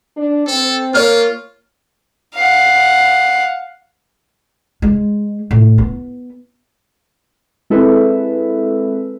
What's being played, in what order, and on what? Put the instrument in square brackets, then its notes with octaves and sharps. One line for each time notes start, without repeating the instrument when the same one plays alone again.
[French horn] D4
[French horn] C4 [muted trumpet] A4
[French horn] A#3 [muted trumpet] F4 [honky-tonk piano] C#5 F6
[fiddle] F5 F#5
[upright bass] G#3
A2
B3
[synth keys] G#3 C4 E4 A4 B4 E5